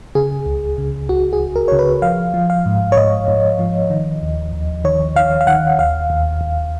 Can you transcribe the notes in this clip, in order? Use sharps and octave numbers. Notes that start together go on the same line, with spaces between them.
C#3 G#4
C#2
C#3
C#2 F#4
G#4
C#2
A#4
C#3 C#5
B4
F3 F5
F3
F5
G#2
C#5
G#2 D#5
G#2
F3
D#3
D#2
D#2
D#3 C#5
D#3 F5
F5
D#3 F#5
D#2 F5
D#2
D#2